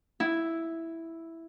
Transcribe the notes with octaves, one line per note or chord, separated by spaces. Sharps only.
E4